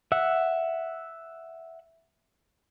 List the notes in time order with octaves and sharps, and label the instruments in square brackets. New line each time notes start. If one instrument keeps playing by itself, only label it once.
[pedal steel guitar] E5 F#5